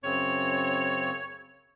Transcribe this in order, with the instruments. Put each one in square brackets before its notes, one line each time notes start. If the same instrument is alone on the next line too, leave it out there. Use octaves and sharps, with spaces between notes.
[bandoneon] F#2 C#3 C4 [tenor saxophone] C#5